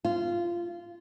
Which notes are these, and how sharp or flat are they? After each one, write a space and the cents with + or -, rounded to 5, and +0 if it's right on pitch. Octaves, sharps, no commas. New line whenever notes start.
F4 -15